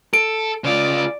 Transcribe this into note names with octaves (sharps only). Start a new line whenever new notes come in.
A4 D7
C#3 F4 D5